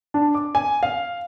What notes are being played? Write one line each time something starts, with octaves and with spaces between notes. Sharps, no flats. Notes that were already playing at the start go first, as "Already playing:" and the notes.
D4
D6
G#5
F5